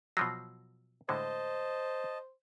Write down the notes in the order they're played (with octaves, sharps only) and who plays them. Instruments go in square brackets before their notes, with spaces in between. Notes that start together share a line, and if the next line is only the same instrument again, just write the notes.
[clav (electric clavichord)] B2 F3 F#3 [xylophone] E6 A#6 C7
[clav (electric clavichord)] A2 D3 G#3 [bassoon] C5 [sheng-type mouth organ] D#5 A5